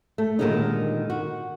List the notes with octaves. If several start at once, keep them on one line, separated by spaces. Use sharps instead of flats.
A3
A#2 D3 D#3 G3 G#3 D#4
F#4